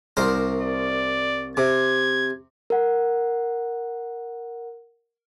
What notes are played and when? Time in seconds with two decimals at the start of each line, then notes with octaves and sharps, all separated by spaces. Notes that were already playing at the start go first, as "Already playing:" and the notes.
0.17 C2 A#4 C5
0.62 D5
1.57 C3 G#6
2.70 A#4 F#5